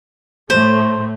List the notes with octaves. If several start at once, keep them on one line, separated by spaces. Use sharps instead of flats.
A2 A3 C5